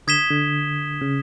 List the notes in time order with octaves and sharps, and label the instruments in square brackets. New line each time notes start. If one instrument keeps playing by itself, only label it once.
[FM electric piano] D3 [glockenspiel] D#6 G#6 B6 E7 G7
[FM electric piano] D3
C#3